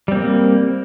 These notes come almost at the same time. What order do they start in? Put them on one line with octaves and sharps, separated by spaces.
G3 C4 A#3